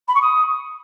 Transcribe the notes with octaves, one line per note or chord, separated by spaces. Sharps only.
B5
C#6
D#6